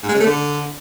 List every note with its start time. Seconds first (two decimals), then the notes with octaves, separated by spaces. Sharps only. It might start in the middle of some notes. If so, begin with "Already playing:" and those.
0.03 G#2
0.09 G#3
0.15 C#3
0.20 A3
0.26 D3